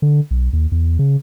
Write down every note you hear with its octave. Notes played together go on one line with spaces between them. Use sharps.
D3
B1
D#2
E2
C#3